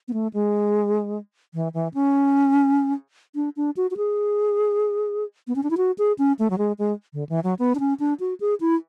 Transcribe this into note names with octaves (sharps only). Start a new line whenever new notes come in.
B3
A3
G#3
E3
E3
C#4
D4
D4
F#4
F#4
G#4
B3
C#4
D4
E4
F#4
G#4
C#4
A3
F#3
G#3
G#3
D3
E3
F#3
B3
D4
C#4
D4
F#4
G#4
E4